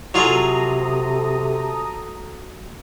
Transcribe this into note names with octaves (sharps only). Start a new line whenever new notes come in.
C3 F#3 F4 G#4 A4 A#5 D#6